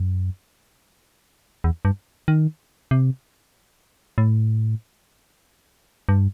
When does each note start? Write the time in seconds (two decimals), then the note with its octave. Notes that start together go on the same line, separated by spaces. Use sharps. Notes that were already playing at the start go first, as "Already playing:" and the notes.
Already playing: F#2
1.64 E2
1.85 G2
2.28 D#3
2.91 C3
4.18 A2
6.09 G2